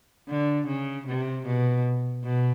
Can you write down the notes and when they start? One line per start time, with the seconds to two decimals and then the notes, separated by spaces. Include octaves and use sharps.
0.29 D3
0.67 C#3
1.07 C3
1.46 B2
2.24 B2